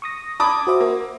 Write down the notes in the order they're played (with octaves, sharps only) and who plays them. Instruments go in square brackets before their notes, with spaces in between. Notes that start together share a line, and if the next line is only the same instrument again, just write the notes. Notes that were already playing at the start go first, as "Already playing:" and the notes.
[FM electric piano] C#6 D#6 A#6
[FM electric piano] A5 G#6 [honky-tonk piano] B5 D6 D#6
[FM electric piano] F#4 C5 E5
[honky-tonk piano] A#3